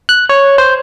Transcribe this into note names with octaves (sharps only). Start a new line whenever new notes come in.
F#6
C#5
C5